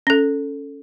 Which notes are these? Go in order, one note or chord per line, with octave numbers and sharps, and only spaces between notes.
C#4 A4